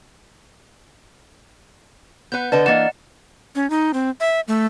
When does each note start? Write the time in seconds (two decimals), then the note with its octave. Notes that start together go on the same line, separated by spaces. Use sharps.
2.32 B3 B4 F#5 G6
2.52 D3 B4 D5 D#5 A5
2.66 E3 A#3 D4 D#5 F#5 A6 E7
3.55 C#4
3.70 D#4
3.94 C4
4.20 E5
4.48 A3